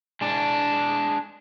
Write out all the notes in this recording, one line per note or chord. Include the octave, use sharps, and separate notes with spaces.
G#3 D4